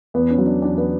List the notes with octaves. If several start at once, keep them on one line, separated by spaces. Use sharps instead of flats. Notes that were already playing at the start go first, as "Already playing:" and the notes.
E2 B3
C#4
F#3
D4
E2 D4
B3